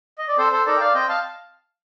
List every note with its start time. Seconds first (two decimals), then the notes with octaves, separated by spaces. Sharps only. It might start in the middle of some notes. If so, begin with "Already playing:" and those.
0.18 D#5
0.28 D5
0.38 C4 A4 C5
0.52 A4 C5
0.66 D#4 A4 A#4 D5
0.77 G5
0.80 D5 F5
0.94 C4 D#5 G5
1.09 F5 A5